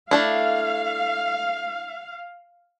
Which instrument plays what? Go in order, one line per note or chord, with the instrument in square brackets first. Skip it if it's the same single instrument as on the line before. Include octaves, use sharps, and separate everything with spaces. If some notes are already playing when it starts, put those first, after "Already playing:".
[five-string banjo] A3 D4 E4 [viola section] F5